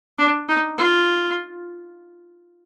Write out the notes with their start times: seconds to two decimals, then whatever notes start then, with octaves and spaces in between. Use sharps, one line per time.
0.18 D4
0.49 D#4
0.78 F4